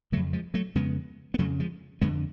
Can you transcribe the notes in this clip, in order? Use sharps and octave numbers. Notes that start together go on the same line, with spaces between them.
F2 C#3 F#3 A3
F3 G#3
F#3 A3
F2 C#3 G#3 B3
B3
F2 C#3 F#3 A3
F3 G#3
F2 D3 G#3 B3